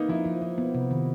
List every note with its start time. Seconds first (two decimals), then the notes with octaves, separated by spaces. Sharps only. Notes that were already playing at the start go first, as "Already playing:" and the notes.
Already playing: A#3 B3 D#4
0.09 F3 E4
0.25 F3
0.42 F3
0.58 B3
0.75 C3
0.91 D#3